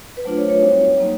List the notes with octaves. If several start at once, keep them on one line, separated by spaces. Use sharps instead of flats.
B4
F#3 A3 D4 F4 C5
C#5
C#5
G3 C4 D#4 F#4
F#3 A#3 D#4